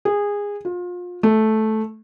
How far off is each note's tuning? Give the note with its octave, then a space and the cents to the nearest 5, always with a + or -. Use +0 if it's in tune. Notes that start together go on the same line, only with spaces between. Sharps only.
G#4 -20
F4 +30
A3 -10